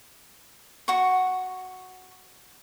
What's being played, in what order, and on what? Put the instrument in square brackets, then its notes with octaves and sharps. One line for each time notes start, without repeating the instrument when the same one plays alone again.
[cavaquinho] F#4 C#6